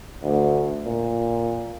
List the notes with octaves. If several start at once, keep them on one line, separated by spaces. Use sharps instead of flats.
D2
A#2